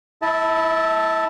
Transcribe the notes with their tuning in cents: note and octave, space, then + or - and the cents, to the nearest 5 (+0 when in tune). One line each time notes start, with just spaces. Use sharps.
E4 +0 E5 -40 A5 +0